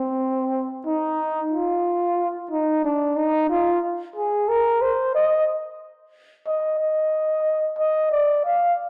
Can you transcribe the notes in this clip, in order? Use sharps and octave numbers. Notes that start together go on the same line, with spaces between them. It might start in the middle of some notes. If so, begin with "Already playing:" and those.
Already playing: C4
D#4
F4
D#4
D4
D#4
F4
G#4
A#4
C5
D#5
D#5
D#5
D#5
D5
F5